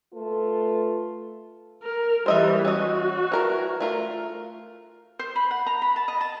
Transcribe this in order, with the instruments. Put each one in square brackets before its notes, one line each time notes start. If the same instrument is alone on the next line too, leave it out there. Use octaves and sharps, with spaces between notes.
[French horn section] A3 F4 A4 B4
[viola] A#4
[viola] E3 G3 [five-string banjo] C5 D#5 E5
[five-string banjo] C#4 D#5 [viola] F#4
[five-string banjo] E3 A#4 A#5
A3 F4 A#4
[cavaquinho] C5
B5
F#5
A#5
B5
A5
D#5
A5